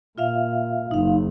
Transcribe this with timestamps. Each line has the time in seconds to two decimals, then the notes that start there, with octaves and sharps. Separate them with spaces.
0.18 A#2 F4 E5 F5
0.91 F#1 D#4 F5